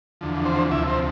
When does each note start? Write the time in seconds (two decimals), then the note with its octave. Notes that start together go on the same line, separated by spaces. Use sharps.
0.21 E2 D3 F3
0.45 C4 C5
0.71 D2 C3 F3 E4 E5
0.88 C4 C5